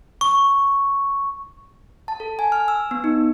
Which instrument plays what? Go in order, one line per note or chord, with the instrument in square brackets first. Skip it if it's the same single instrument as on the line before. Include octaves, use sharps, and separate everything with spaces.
[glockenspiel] C#6
[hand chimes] A5
A4
G#5
F6
E6
B3
D#4